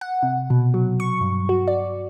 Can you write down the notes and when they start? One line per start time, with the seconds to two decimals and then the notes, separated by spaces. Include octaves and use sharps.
0.01 F#5
0.23 C3
0.50 B2
0.74 F#3
1.00 C#6
1.21 G2
1.49 F#4
1.68 D5